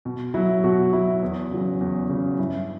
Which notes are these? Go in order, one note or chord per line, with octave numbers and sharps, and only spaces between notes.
B2
F#3 E4
B2 F#4
F#3 E4
E2
C#3 F#3
E2
C#3
F#3
G2 E4